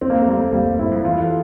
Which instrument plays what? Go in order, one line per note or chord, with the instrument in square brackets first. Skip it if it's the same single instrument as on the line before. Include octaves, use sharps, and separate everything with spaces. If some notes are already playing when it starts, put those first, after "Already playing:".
[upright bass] F2 [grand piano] C4
[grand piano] A#3
A3
G3 A#3
[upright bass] F2 [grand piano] G3 A#3
[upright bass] E2
[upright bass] G2 [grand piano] C4 E4
[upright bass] F2
[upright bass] E2 [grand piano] F4 A4